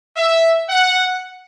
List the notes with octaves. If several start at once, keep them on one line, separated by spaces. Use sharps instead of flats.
E5
F#5